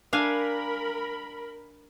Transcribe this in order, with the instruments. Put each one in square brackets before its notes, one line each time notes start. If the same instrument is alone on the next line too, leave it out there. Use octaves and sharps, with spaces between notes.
[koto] D4 F5 G#5 [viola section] A#4 B5